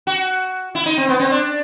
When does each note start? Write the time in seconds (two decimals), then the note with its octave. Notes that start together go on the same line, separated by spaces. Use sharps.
0.07 F#4
0.75 E4
0.86 D#4
0.98 C4
1.09 B3
1.20 C4
1.31 D4